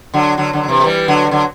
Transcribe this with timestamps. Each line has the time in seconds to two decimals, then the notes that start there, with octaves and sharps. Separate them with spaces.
0.14 D3 F#3
0.37 D3 F#3
0.53 D3 F#3
0.63 D3
0.68 C3 E3
0.80 A3
0.84 E3 G3
1.08 D3 F#3
1.27 G3
1.31 D3 F#3